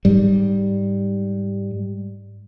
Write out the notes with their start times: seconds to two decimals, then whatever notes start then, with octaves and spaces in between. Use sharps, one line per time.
0.05 G#2 G3